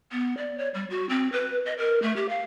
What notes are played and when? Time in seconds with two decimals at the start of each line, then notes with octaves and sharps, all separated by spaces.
0.12 B3
0.37 D5
0.58 C#5
0.74 G3
0.90 F#4
1.09 C4
1.32 B4
1.66 D#5
1.78 A#4
2.02 A3
2.16 G4
2.29 F5